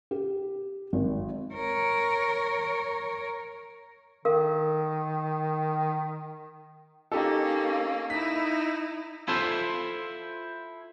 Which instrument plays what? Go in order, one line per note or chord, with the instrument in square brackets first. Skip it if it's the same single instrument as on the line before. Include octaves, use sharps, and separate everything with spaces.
[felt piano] G4
G#1
[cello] A#4 C#5
[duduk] D#3 [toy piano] A4 A#4 F5
[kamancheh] A#3 C#4 [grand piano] D#4 G4 A4
[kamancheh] D#4 E4 [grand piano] B6
[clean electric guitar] E4 F4 A4 C5 E5